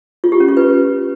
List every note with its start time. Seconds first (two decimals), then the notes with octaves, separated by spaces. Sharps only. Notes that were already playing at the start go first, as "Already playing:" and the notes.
0.24 F4
0.32 G4
0.40 C#4
0.49 F4
0.57 B4